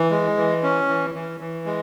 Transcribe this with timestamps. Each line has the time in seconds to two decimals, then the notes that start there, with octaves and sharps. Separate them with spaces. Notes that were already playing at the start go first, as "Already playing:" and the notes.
Already playing: E3
0.11 G#3
0.37 E3
0.63 C#4
0.88 E3
1.15 E3
1.40 E3
1.66 G#3